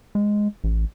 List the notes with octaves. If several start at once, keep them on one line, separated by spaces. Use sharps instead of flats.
G#3
A1